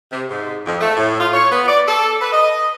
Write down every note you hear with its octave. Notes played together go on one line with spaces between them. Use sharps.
C3
G#2
F2
A3
A2
F4
C#5
B3
D5
A4
B4
D#5